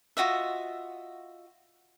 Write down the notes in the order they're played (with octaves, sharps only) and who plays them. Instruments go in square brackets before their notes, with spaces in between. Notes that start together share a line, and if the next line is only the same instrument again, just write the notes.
[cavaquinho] F4 F#4 D#5 E5